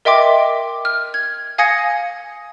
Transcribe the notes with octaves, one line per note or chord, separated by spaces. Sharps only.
A#4 D#5 E5 G5 C6 D6
F6
G#6
F5 G#5 D#6 G#6 A#6 C#7